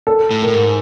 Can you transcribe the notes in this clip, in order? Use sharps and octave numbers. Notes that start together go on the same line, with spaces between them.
A4
A2
A#4
A2
G#2